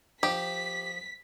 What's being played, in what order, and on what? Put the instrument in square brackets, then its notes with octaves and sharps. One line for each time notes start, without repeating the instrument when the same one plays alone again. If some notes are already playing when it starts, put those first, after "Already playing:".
[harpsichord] F3 [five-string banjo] G4 [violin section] B6